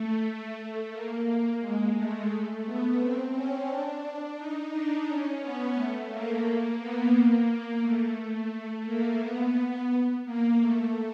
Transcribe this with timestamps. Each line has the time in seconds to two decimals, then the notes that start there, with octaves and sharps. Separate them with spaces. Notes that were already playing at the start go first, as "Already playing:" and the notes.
Already playing: A3
0.57 A3
0.92 A#3
1.26 A#3
1.61 G#3
1.95 A3
2.65 B3
3.00 C4
3.33 C#4
3.68 D4
4.37 D#4
4.72 D4
5.07 C#4
5.41 B3
5.75 A3
6.10 A#3
6.44 A#3
6.79 B3
7.13 A#3
7.82 A3
8.51 A3
8.86 A#3
9.21 B3
10.25 A#3
10.59 A3